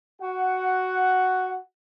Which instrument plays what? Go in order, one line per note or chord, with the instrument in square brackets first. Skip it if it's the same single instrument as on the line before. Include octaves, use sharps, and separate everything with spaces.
[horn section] F#4 F#5